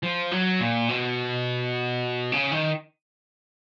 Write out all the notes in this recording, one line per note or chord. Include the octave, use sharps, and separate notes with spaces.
F3
F#3
A#2
B2
C#3
D#3